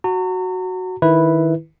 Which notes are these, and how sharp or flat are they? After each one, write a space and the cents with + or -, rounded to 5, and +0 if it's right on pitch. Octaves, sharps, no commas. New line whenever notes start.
F#4 +0 A#5 -40
D#3 +0 E4 -5 B4 +0